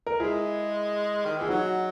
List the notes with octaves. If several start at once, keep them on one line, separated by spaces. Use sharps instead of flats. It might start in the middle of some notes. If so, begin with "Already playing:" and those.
A#4
G#3 E4 G#4
D#3
E3 G#4
F#3 D#4 F#4